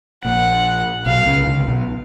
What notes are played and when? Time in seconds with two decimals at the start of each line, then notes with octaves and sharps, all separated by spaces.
0.24 A#1 A#2 F#5
1.06 B1 B2 F5
1.26 C#2 C#3
1.47 C#2 C#3
1.67 B1 B2